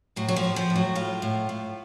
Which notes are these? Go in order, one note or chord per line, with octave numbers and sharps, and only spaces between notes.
A2 F#3
F#3
F3
A2
F3
A2
F#3
A2 F4
A2
A2